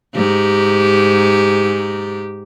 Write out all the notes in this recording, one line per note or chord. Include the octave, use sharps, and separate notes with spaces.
G#2 G4